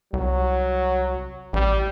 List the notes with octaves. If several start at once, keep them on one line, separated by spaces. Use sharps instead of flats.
C2 F#3
A1 G3